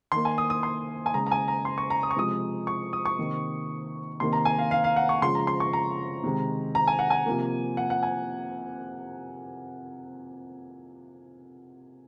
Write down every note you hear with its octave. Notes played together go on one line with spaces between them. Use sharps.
D#3 A#3 C6
G#5
D#6
D#6
C6
G#5
C#3 G#3 A#5
A#5
G#5
A#5
C6
C#6
A#5
D#6
C#6
C3 F3 G#3 D#6
C#6
D#6
C#6
C3 D#3 A#3
C3 D#3 A#3 C6
A#5
G#5
F5
F5
F5
F#5
C#6
C#3 F3 G#3 C6
A#5
C6
C#6
A#5
C3 D#3 G#3
A#5
G#5
F#5
G#5
C3 F3 A#3
F#5
F#5
G#5